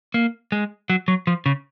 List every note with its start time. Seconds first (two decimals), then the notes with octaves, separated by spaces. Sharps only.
0.14 A#3
0.52 G#3
0.90 F#3
1.08 F#3
1.27 F3
1.46 C#3